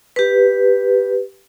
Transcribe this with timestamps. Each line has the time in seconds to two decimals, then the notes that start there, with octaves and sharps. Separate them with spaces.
0.16 G4 B4